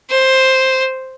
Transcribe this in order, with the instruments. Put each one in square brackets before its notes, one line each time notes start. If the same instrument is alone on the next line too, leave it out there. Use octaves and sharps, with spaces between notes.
[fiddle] C5